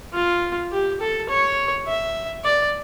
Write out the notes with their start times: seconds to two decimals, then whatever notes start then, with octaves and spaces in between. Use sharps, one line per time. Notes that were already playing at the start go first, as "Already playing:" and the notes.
0.14 F4
0.71 G4
1.00 A4
1.30 C#5
1.87 E5
2.44 D5